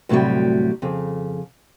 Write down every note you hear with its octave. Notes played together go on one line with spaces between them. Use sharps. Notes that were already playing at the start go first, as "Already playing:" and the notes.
D2 A2 C3 F#3 G3
F2 C#3